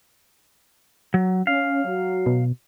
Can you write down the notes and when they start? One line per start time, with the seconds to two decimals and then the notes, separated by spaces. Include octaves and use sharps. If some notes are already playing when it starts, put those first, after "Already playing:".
1.14 F#3
1.47 C#4 F5
1.85 F#3
2.26 B2